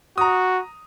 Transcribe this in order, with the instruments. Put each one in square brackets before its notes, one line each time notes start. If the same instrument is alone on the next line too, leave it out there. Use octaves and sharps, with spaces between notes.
[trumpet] F#4 [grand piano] A#5 D#6